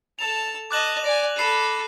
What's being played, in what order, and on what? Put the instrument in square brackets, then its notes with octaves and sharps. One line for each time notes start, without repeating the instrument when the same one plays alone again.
[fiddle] A4 A5 [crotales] F7
[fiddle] D#5 A5 [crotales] D6 F#6 F#7
[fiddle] D5 G#5 [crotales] A#6
[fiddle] A4 B5 [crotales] C7 D#7